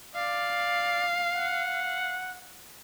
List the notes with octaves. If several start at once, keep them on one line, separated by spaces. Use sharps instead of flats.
D5 F5
F#5